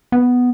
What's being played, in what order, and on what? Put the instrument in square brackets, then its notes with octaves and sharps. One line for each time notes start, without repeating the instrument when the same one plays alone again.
[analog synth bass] B3